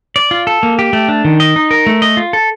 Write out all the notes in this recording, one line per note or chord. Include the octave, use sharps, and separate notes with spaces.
D5
F4
A4
A#3
G4
A3
D4
D#3
D#5
D#4
A#4
A3
D#5
F4
A4